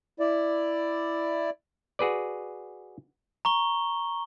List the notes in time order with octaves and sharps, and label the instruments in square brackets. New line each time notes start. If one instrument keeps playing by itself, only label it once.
[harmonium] E4 D5
[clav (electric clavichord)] F#4 G#4 B4 D5
[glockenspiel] A#5 C#6 G7